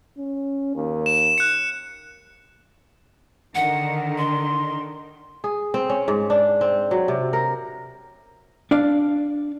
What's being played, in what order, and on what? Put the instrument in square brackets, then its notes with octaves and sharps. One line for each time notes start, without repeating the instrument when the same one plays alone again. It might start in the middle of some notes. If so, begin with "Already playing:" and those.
[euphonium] C#4
D#2
[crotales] E7
F#6 C#7
[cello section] D3 D#3 [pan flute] F#5
[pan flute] C6
[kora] G#4
C4
C#4
G#2
D4
C4
F#3
C3
A#4
[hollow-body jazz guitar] D4 D5 F5